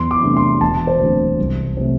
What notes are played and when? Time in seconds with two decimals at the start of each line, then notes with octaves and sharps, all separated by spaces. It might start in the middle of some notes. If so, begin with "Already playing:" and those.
Already playing: E2 C6
0.11 D6
0.23 C3 A3 D4
0.37 C6
0.61 E1 A5
0.87 C5
1.00 D2 D3 C4
1.39 C2
1.77 C3 A3 C4